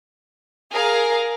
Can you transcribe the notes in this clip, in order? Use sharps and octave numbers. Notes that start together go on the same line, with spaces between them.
G#4 A#4 F5